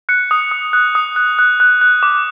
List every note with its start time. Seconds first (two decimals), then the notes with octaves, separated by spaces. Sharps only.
0.09 F#6 C#7
0.31 D#6
0.51 D#6
0.73 F#6
0.95 D#6
1.16 F#6
1.39 F#6
1.60 F#6
1.81 F#6
2.03 D6